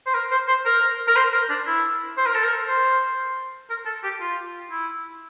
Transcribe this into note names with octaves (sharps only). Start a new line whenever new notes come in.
C5
A#4
C5
C5
A#4
A#4
C5
A#4
D4
E4
C5
A#4
A4
A#4
C5
A#4
A4
G4
F4
E4